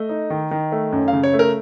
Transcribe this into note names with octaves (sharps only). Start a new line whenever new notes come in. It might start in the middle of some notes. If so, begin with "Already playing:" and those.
Already playing: A3 D#5
D#4
D#3
D#3
A3
F#2
F5
C#3
C#5
A3
A#4